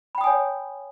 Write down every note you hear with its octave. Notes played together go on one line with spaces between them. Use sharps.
C#5 G5 G#5 B5 D#6